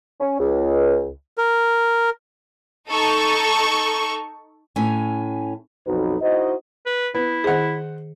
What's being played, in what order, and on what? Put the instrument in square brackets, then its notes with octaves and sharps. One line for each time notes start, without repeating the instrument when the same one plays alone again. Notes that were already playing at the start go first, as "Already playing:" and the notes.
[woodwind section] C#4
C#2
[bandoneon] A#4
[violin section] D#4 A4 C#6
[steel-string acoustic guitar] A2 C#4 G#5
[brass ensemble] B1 F2 D#4 F#4 B4
D#4 E4 F#4 C5 D#5
[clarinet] B4
[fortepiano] B3 [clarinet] E4
[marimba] D#3 G#4 [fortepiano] C5 F#5